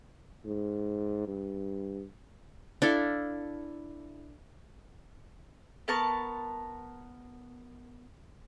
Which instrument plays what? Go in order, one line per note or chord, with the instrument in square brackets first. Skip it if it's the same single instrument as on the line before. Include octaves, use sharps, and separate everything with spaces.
[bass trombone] G#2
G2
[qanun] D4 E4 A4 F5
[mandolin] B3 A#4 A5 C#6